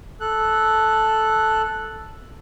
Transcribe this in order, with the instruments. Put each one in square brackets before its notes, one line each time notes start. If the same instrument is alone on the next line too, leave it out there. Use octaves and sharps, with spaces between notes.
[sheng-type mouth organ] A4 F#6